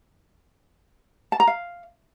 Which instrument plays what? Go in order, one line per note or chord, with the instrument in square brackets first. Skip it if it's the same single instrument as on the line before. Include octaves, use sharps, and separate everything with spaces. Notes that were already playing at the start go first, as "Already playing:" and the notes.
[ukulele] A5
A#5
F5